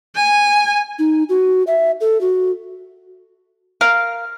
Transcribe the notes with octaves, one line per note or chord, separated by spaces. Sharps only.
G#5
D#4
F#4
E5
A4
F#4
A#4 F5